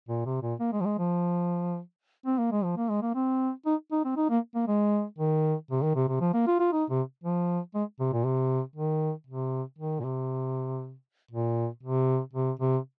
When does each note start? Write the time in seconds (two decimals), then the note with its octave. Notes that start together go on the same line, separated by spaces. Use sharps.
0.09 A#2
0.26 C3
0.43 A#2
0.60 A#3
0.73 G#3
0.81 F3
0.86 G#3
0.99 F3
2.26 C4
2.38 A#3
2.52 G#3
2.64 F3
2.77 A#3
2.89 G#3
3.02 A#3
3.15 C4
3.66 D#4
3.92 D#4
4.05 C4
4.17 D#4
4.30 A#3
4.55 A#3
4.68 G#3
5.19 D#3
5.71 C3
5.83 D#3
5.96 C3
6.09 C3
6.21 F3
6.34 A#3
6.47 F4
6.60 F4
6.73 D#4
6.90 C3
7.24 F3
7.75 G#3
8.00 C3
8.13 A#2
8.25 C3
8.76 D#3
9.27 C3
9.79 D#3
10.00 A#2
10.05 C3
11.31 A#2
11.83 C3
12.34 C3
12.60 C3